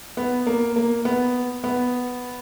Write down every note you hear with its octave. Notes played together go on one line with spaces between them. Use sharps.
B3
A#3
A#3
B3
B3